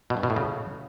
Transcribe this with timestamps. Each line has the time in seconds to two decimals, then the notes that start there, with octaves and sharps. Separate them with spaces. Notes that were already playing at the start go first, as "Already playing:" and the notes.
0.10 B2
0.17 G2
0.23 B2
0.30 A2
0.36 C#3